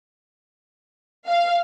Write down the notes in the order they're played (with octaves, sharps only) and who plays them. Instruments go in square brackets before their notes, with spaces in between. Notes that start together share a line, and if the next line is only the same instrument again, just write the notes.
[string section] F5